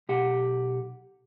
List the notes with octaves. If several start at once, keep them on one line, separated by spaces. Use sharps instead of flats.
B1 G4 F#5